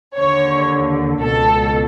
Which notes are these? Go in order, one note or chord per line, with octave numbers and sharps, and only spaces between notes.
D#2 D3 C#5
C#2 B2 A4